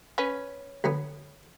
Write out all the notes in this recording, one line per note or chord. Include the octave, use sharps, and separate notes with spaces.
C#4 B4
D2 F#3 B3